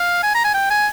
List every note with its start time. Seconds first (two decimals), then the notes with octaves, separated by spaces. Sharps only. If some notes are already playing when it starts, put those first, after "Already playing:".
Already playing: F5
0.23 G#5
0.34 A#5
0.44 G#5
0.54 G5
0.71 G#5